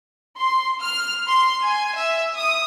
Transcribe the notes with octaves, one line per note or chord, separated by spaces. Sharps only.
C6
F6
C6
G#5
E5
D#6